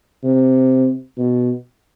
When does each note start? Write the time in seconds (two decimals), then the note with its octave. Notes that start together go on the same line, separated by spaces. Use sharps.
0.24 C3
1.18 B2